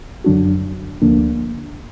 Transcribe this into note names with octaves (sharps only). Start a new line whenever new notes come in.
F#2 D3 F#3 D4 F#4
D2 D3 F3 A#3 D4